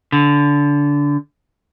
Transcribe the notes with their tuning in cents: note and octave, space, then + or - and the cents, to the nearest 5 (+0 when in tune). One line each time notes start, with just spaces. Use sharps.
D3 -20